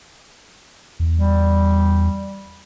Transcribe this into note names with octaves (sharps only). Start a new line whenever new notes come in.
E2
G3